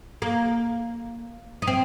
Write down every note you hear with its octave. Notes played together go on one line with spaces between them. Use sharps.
A#3
D#4
C4